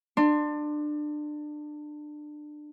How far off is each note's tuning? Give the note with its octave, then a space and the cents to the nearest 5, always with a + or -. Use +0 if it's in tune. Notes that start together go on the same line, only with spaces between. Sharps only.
D4 +25 C6 +0